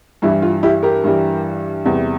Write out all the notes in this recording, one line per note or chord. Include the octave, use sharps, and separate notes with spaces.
G2 E3 G3 E4
F4
E4 G4
G4 A#4
G2 E3 G3
E2 C3 G3